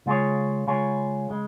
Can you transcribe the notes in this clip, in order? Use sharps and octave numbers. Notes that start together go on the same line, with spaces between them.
C#3 G#3 F4 G#4 C#5
C#3 G#3 F4 G#4 C#5
C#3 G#3